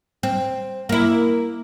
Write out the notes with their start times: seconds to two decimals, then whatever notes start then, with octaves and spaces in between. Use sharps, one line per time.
0.23 C4
0.89 A#3 E4